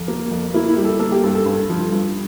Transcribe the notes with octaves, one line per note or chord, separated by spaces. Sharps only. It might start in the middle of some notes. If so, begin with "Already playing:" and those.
Already playing: F2
A#3
F2
A#3 E4
E4
G3
A4
A#3 A4
G4
G2 A4
A4
G2
F3
G2